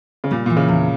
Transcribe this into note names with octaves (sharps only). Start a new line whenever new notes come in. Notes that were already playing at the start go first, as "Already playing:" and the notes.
C#3
A#2 G3
A#2 E3
C#3
E2